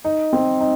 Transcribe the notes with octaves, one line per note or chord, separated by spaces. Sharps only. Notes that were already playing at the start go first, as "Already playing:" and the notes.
D#4
C4
D#4